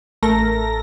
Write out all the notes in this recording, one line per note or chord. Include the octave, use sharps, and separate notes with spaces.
A1 A3 A4 A#4 A#6